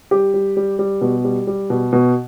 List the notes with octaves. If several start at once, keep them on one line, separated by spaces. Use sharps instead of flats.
G3 G4
G3
G3
G3
B2
G3
G3
B2
B2